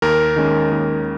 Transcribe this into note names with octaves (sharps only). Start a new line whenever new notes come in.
D#2 A#4
D#3 G#3 C#4
D#2